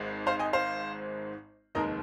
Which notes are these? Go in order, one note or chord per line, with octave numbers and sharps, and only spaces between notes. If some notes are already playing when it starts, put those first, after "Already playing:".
Already playing: G#1 G#2 G#3
C5 F5
D#5 G#5
C5 F5
F1 D#2 D#3 G#3 A#4 D#5